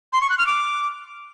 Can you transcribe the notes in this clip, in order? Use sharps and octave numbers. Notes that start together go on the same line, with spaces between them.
C6
C#6
F#6
F6
D6